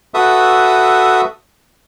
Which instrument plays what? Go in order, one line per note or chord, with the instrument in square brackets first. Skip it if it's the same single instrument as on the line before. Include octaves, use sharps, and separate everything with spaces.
[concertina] F#4 A4 B4 E5 D#6